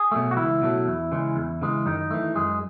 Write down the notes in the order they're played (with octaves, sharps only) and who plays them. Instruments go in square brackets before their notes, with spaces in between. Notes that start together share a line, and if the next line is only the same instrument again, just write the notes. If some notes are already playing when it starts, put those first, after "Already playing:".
Already playing: [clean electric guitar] G#4
B2 F#3 A3
F#4
C#2 E3 E4
B2 F#3 A3
E2
C#3 E3 G#3
E2
C#3 E3 G#3
F#2 D#3 D#4
E3 A3
F#2 G#3 G#4